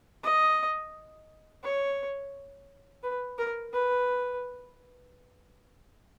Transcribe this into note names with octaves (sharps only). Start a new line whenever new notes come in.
D#5
C#5
B4
A#4
B4